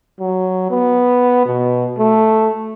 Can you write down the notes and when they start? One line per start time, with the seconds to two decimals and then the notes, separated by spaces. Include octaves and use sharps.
0.20 F#3
0.70 B3
1.45 B2
1.98 A3